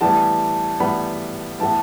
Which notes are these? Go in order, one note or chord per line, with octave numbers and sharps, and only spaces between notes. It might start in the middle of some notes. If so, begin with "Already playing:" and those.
A2 E3 G3 B3 A5
A2 E3 G3 B3 B5
A2 E3 B3 A5